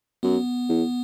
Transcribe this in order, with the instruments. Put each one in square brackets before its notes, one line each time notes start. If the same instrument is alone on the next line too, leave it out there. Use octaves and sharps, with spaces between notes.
[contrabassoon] F#2 [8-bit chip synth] B3
[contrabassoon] E2